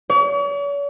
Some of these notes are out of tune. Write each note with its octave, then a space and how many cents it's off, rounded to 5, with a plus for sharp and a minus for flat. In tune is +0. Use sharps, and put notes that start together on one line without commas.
C#5 +45